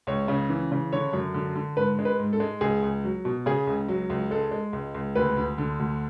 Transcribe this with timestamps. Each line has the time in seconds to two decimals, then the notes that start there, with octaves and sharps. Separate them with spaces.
0.07 C#2 C#5
0.28 C#3
0.49 E3
0.72 C#3
0.93 D3 C#5
1.13 F#2
1.34 D3
1.55 D3
1.76 G#2 B4
1.99 G#3
2.05 B4
2.20 G#2
2.33 A4
2.40 G#3
2.61 C#2 G#4
2.83 C#2
3.04 F#3
3.25 B2
3.46 C#3 G#4
3.67 C#2
3.88 F#3
4.10 C#2
4.31 G#3 A4
4.51 G#3
4.73 C#2
4.94 C#2
5.15 D2 B4
5.37 D2
5.58 D3
5.79 D2